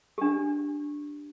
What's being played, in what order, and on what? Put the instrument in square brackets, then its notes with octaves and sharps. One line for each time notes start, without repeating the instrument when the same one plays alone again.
[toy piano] D4 G4